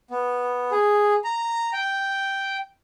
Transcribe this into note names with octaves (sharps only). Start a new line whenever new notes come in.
B3
G#4
A#5
G5